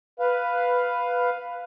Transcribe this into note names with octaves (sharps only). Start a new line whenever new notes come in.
B4 F5